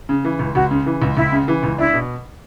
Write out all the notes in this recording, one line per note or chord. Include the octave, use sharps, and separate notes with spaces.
C#3
E3
C#2
C#2 F#4
C#3
E3
C#2
C#2 E4
C#3
E3
C#2
D4 E4
B2